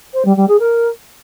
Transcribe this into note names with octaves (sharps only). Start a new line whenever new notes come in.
C5
G3
G3
G#4
A#4